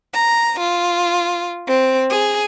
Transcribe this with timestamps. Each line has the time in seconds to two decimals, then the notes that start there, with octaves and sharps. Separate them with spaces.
0.14 A#5
0.59 F4
1.69 C4
2.10 G#4